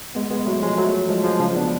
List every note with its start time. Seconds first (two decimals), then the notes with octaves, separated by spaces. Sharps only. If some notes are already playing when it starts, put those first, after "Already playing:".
0.15 G#3 B3
0.31 G#3 B3
0.46 F#3 A3
0.62 F3 G#3
0.78 F#3 A3
1.09 F3 G#3
1.24 F3 G#3
1.39 C#3 F3
1.55 B3 D4